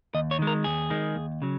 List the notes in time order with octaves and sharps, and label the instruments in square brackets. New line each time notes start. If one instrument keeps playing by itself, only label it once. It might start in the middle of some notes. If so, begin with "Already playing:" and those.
[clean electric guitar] D#2 D#5
C#5
D#3 G#3
A#4
D#2 G#4
D#3 G#3
D#2
C#3 F#3